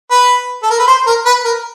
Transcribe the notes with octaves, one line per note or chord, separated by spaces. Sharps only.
B4
A4
A#4
B4
C5
A#4
B4
A#4